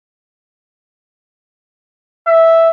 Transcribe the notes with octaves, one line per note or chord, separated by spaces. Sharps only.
E5